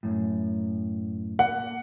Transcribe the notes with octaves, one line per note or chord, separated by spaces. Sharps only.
F#2 A2
A#3 F#5